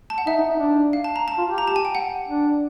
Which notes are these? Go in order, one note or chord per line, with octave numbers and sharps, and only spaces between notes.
A5
F#5
D#4 E5
D#4
D#4
D4
F5
A5
A#5
A5
F4
G4
A#5
A5
G#5
G5
F#5
D4